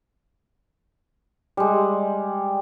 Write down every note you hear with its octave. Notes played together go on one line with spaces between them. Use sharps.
G3 G#3